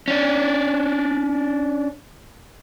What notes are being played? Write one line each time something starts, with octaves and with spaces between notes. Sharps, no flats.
C#4 D4